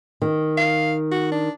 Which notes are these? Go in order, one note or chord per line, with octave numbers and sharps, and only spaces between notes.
D#3
F5
F#4
D4